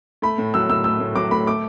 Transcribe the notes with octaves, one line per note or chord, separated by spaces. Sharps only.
A3 B5
A2
F#3 E6
A2 E6
A3 E6
A2
F#3 D6
A2 B5
A3 D6